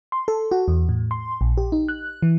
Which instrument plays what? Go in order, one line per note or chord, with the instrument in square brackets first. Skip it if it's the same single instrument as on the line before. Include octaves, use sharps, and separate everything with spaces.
[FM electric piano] C6
A4
F#4
E2
A2
C6
A#1
G4
D#4
F#6
E3